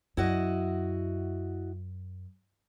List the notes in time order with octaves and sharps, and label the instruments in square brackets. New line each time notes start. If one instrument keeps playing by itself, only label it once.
[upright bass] F#2 [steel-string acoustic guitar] E4 F#4 D#5